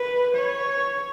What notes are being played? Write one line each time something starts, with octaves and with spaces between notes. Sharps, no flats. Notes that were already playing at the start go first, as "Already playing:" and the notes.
Already playing: B4
C#5